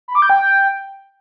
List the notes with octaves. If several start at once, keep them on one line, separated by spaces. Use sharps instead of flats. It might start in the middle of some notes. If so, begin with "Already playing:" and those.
B5
D6
G6
G5